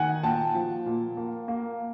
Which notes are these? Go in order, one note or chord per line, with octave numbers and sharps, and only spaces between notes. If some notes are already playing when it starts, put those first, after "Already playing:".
Already playing: D#3 F#5 G#5
A#2 G5 A5
F3
A#2
A#3
A#3